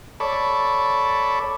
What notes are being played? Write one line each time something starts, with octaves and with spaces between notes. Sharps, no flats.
A4 C#5 D5 B5